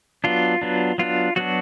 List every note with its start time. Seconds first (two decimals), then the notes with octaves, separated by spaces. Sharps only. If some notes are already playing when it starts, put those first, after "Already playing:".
0.24 F#3 B3 D4 F4
0.62 F#3 B3 D4
0.98 F#3 B3 D4 F4
1.36 F#3 B3 D4 F#4